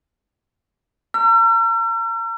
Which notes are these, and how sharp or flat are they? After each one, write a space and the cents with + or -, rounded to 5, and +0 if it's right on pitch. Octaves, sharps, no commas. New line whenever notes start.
A#5 -30 E6 +45